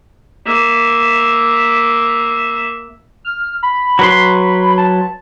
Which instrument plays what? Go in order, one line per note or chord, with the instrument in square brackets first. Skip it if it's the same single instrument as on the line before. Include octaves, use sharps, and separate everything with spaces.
[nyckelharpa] A#3 E5
[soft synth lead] F6
B5
[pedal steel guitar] F#3 B4 C6
[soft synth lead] A5